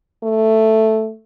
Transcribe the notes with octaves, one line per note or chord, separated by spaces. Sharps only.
A3